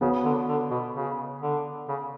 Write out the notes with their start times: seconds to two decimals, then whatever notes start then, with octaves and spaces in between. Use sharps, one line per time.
0.01 C#3 B3 F#4 C#5
0.25 D3
0.49 D3
0.71 B2
0.95 C#3
1.41 D3
1.88 C#3